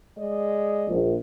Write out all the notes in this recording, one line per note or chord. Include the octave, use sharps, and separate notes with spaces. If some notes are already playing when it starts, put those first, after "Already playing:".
G#3 D5 D#5
A#1